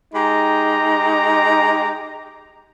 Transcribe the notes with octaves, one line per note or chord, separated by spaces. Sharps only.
G#3 D#4 G4 A#5